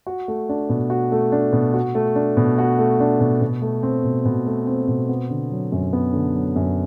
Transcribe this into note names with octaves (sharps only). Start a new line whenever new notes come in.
F#4
A3
D4
B2
F#4
A3
D4
B2
F#4
A3
D4
B2
F#4
A3
D4
B2
B2
A3
C4
B2
B2
A3
C4
B2
B3
D3
F#3
F#2
B3
D3
F#3
F#2